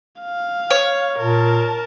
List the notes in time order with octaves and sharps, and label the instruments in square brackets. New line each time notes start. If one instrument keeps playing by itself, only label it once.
[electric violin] F5
[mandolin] C#5
[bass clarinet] A#2 [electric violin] A#4 A5